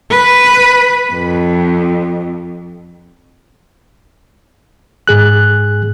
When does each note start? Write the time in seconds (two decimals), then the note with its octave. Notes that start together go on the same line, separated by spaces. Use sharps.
0.11 B4
1.13 F2
5.08 G#2 G#4 F#6